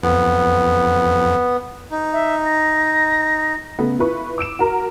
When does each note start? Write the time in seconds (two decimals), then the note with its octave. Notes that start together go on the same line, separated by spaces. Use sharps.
0.03 F2 B3
1.91 D#4
2.13 E5
2.45 A#6
3.79 C#3 A3 B3
3.99 E4 F4 B4 C#6
4.38 D6 E6 D7 E7
4.59 F#4 A#4 A#5